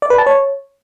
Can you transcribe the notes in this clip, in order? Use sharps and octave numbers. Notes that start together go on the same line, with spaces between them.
D5
B4
A5
C#5